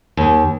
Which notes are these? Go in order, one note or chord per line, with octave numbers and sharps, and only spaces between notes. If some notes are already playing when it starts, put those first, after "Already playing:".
D#2